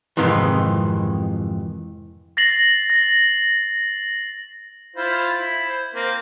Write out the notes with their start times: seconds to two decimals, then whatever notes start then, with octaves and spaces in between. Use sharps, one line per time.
0.17 F2 G#2 C3 D#3 E3
2.37 A6 A#6 C7 F#7
2.90 A#6
4.96 E4 F4 C5
5.38 E4
5.65 C5
5.94 A#3 C4